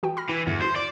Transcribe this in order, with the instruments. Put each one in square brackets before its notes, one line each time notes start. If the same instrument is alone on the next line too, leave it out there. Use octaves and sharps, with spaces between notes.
[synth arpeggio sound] E3 F#4 G5
B5 F6 A#6
[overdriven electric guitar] E3
[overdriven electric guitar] E2 [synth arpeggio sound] G2 D3
[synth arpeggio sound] E4 F#4 [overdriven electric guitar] C5
[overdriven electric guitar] D5